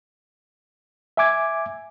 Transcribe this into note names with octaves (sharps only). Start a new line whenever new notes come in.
E5 G#5 D6 G#6